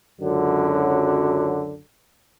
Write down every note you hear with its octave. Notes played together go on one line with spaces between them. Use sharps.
C#2 F#2 D3 F#3